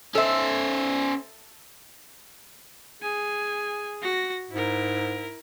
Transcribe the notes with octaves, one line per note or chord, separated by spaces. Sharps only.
C#4 A4 C5 E5
G#4 G#5
F#4 A#6
G#2 E4 A#4